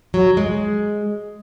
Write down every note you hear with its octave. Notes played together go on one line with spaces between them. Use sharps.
F#3
G#3